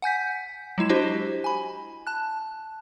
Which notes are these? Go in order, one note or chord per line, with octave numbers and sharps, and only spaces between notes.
F#5 G#5 G6 B6
F#3 G#3 E4 E7
D4 E4 F#4 G4 C5 D#5
G#5 B5
A5 F#6